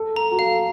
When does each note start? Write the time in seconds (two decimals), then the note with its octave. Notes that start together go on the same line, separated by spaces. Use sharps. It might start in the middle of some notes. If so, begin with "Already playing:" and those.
Already playing: A4
0.15 A4 A#5
0.31 F#4
0.38 A4 F5